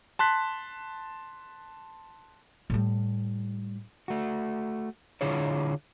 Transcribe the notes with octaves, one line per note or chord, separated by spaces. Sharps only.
A5 C6 F#6 B6
A2 G3
A3 F#4
D3 D4 E4 F4 G#4 C#5